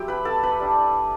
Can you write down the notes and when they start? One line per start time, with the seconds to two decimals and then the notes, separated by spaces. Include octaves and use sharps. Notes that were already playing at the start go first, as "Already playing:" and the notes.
Already playing: F#3 C4 E4 G4 G5
0.08 B4 B5
0.25 A4 A5
0.43 B4 B5
0.60 G3 D4